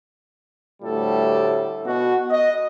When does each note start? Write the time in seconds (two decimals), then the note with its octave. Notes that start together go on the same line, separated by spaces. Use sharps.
0.83 D2 A2 G3 A4
1.86 B2 F#4
2.31 D#5